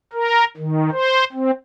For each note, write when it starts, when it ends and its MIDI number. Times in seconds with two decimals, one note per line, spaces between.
0.13 0.44 70
0.57 0.90 51
0.91 1.24 72
1.32 1.51 60